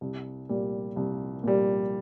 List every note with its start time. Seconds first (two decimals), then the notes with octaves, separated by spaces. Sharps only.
0.01 C2
0.49 A#2 G3
0.96 C2
1.44 A#2 G3